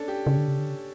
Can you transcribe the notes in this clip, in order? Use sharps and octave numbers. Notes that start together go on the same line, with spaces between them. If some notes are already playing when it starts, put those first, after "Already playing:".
Already playing: C#4 D4 A4
G4
C#3
D3
C#3
D3
C#3